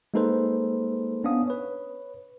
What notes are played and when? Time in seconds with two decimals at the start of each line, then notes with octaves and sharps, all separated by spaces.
0.14 G#3 A#3 D#4 A4 B4 C5
1.24 B3 C#4 D4 F5 D#6
1.48 B4 C#5